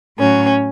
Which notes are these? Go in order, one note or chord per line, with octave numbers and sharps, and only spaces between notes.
A2 F#3 C#4